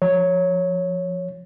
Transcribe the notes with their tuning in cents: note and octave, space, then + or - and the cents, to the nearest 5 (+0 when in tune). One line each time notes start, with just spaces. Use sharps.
F3 +0 C#5 +0